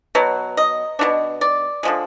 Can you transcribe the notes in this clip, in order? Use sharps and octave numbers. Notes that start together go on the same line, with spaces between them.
B2 F#3
D#5
B2 F#3 D4
D5
D3 F3 G#3